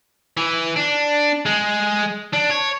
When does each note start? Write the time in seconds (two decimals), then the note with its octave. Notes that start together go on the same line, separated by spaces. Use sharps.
0.37 E3
0.76 D4
1.46 G#3
2.33 D4
2.51 C#5